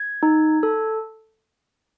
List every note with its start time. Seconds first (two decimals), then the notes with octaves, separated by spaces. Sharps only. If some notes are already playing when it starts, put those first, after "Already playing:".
Already playing: G#6
0.23 D#4
0.63 A4